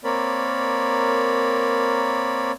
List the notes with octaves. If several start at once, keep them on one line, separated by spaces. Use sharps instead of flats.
A#3 C4 A#4 C#5 D5 B5